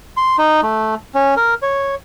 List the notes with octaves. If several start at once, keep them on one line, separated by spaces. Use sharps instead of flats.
C6
D#4
A3
C#4
A#4
C#5